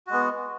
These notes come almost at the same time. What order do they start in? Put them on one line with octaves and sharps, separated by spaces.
F#4 G#3 B3